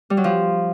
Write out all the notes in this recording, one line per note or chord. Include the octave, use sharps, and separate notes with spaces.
G3
F#3
F3